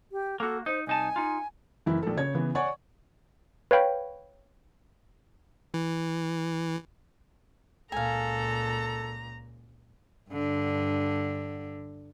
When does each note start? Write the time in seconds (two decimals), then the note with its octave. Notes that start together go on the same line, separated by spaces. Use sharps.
0.12 G4
0.40 A#3 F#4 A4
0.66 D#4 C5
0.87 C2 D#4 G#5 A5
1.16 D#4 F4
1.86 F#1 E3 E4
2.02 A#1 A4
2.17 C#3 C#5 G#6
2.35 C#3 E3 B3
2.55 C#5 D5 F#5 G#5 C#6
3.71 B4 C#5 F5 G5 B5
5.74 E3
7.92 C#2 A#2 A4 F5 G#5 A#5
10.30 G2 D3